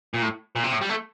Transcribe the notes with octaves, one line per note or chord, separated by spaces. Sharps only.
A#2
A2
A#2
C3
A2
G3
A3